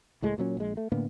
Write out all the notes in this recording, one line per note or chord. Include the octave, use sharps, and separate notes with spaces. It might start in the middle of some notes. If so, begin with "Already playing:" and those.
C#2 A2 G#3
A#2 F#3 C#4
A#1 G#3
A3
A2 D3 A#3 B3